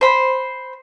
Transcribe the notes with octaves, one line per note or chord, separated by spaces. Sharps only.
C5 B5